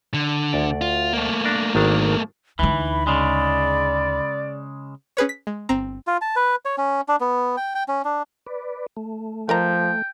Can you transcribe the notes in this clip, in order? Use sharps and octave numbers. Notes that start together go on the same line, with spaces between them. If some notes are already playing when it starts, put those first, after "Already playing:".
D3
D2 D5
F4
A3 A#3
D4 A#4
G#1 D#3 D4
D2 E3 D#4 B5
C#3 G#3 D5
C#4 G#4 B4 C#5
B6
G#3
G1 C4 A#5
F4
A5
B4
C#5
C#4
D4
B3
G5
G5
C#4
D4
B4 D5
A3
F3 A#4 D#5 G5 A#5